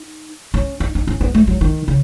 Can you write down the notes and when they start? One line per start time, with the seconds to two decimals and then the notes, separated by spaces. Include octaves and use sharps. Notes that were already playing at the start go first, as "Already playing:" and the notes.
Already playing: D#4
0.54 C#4
0.80 D#4
0.95 D#4
1.07 C#4
1.21 B3
1.34 A3
1.47 F#3
1.61 D#3
1.88 C#3